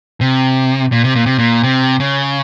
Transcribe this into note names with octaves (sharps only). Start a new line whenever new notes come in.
C3
A#2
C3
A#2
C3
A#2
C3
C#3